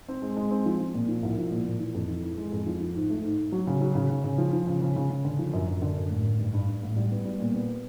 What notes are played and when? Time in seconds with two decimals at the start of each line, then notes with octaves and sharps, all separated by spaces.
0.09 C4
0.22 G#3
0.37 G#3
0.51 C4
0.66 F3
0.80 F3
0.94 A#2
1.08 F3
1.23 C2
1.38 F3
1.52 A#2
1.66 A#2
1.80 E3
1.95 F2
2.08 E3
2.23 E3
2.38 G#3
2.52 F2
2.66 F3
2.80 F3
2.95 G#2
3.10 A3
3.24 G#2
3.38 G#2
3.52 F#3
3.67 C#3
3.81 F#3
3.95 C#3
4.10 C#3
4.24 C#3
4.38 F3
4.53 F3
4.67 C#3
4.82 C#3
4.96 C#3
5.10 C#3
5.25 D3
5.39 F3
5.53 F#2
5.67 F#2
5.82 D3
5.97 F#2
6.10 A1
6.25 A1
6.39 G2
6.54 G2
6.68 G2
6.83 A1
6.96 G3
7.11 B3
7.25 G3
7.40 A#2
7.54 B3